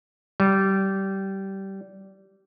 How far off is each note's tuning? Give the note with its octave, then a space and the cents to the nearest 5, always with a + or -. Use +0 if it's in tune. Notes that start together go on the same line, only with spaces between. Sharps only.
G3 -20